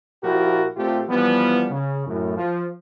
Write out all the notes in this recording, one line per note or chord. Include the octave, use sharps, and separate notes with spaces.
A#2 F3 E4 F#4 G4 A#4
A#2 A3 C4 F4 G4
E3 F3 G3 B3
C#3
F#2 A2
F3